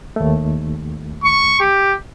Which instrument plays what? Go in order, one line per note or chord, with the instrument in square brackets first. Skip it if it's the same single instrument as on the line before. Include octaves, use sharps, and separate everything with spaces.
[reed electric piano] D#2 A3
[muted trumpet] C#6
G4